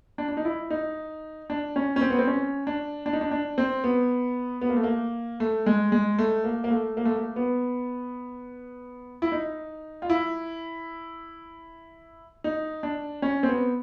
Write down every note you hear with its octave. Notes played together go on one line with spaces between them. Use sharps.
D4
D4
D#4
E4
D#4
D4
C#4
C#4
C4
B3
C4
C#4
D4
D4
D#4
D4
D4
C4
B3
B3
A#3
A3
A#3
A3
G#3
G#3
A3
A#3
A#3
A3
A#3
A3
A#3
B3
E4
D#4
F4
E4
D#4
D4
C#4
C4
B3